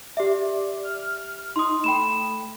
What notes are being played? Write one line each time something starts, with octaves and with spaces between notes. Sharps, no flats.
G4 D5 E5
F6
D#4 C6 D#6
A3 G5 B5 E7